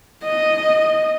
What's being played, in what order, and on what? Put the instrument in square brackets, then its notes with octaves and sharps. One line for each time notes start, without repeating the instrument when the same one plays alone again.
[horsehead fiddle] D#5